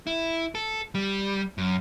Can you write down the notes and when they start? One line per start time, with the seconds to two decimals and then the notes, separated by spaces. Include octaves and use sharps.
0.07 E4
0.55 A4
0.95 G3
1.58 F#2